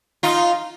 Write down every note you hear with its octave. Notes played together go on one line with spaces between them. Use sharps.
D#4 F4